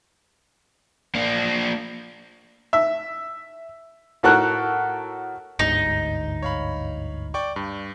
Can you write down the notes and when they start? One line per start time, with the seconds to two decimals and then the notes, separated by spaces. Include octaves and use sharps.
1.15 A#3 D4
2.73 E5
4.23 A2 F#4 A4 A#4 F#6
5.59 G1 D2 G#2 D#4
6.43 C#5 F5 B5
7.34 D5 G5 C#6
7.56 G2